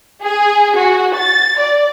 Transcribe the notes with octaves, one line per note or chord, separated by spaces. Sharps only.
G#4
F#4
A6
D5